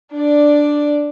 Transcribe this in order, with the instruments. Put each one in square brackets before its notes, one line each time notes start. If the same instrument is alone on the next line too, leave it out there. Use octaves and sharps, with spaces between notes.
[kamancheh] D4 D5